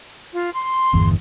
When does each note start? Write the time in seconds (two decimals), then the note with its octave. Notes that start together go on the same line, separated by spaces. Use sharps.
0.33 F4
0.54 C6
0.93 G1 E2